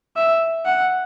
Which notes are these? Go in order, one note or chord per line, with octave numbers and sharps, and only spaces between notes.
E5
F#5